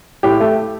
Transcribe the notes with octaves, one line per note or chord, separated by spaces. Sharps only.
A2 G4
A3